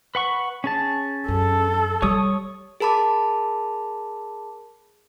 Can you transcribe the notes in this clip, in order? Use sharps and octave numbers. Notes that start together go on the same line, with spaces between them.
B4 F#5 C#6
C#4 G#4 A5
F#2 A4
G3 C#5 D#6
G#4 A#4 A5 B5 D6